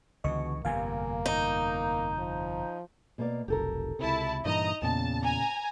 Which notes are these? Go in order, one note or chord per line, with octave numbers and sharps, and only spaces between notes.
C#2 B2 D3 E3 D#5 C#6
G1 F2 C3 A#3 F5 G#5
D#4 A#5 G6
F3
B2 A#3 D5
F1 B1 G4 A4 A#4
C#2 C3 E4 A5
G2 A#2 E3 D#4 D#5 A#5
E2 A#2 C#3 B3 A5
G#5 A#5